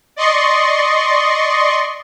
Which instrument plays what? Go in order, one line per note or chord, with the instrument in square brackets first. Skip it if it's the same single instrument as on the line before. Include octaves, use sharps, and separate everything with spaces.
[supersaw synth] D5 D#5 C6 C#6